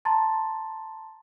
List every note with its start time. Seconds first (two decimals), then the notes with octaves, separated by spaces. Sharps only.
0.05 A5 A#5 C6 A6